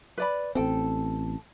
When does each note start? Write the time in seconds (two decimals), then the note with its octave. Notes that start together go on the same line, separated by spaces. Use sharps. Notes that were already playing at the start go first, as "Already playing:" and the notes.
0.18 B4 D5 B5
0.55 A1 C4 A4 G5